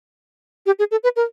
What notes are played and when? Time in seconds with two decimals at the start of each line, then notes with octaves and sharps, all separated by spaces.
0.66 G4
0.79 G#4
0.91 A4
1.03 B4
1.16 A#4